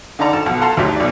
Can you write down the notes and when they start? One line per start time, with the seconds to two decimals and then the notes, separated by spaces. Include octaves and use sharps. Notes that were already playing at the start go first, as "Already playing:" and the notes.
0.19 D3 D#4 A4 D5 A#5
0.33 G#1 A4 A5
0.46 B1 F3 F#5
0.61 F4 A4 F#5 A5 A#5 C6
0.77 D2 F3 F#3 D#4 G4 E5
0.96 B1 D5